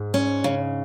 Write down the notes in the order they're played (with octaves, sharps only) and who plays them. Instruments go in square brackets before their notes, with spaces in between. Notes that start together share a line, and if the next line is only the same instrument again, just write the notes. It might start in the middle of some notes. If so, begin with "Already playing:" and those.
Already playing: [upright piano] G#2
[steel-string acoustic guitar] C#4
C#3